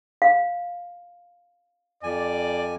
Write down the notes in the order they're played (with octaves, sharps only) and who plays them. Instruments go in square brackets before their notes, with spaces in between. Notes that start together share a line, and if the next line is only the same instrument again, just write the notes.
[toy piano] F5
[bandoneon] F2 G#5 [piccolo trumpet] D5